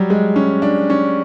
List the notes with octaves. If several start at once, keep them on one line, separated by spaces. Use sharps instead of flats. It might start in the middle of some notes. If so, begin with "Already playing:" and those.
Already playing: F#3 G3
G#3
C#4
D4
C#4